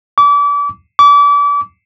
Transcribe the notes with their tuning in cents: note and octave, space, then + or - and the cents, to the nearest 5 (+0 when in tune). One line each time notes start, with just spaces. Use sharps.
D6 -35
D6 -35